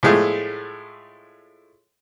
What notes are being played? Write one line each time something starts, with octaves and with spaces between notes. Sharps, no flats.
A2 F3 G#3 A3